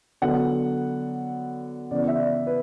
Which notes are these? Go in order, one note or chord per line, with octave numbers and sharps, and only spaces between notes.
D3 F#3 B3 D4 F#5
C#3 E3 B3 D5
E5
D5
B4